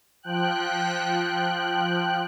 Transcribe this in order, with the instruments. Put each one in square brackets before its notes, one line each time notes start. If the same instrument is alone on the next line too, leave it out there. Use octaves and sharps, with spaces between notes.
[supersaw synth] F3 G5 F#6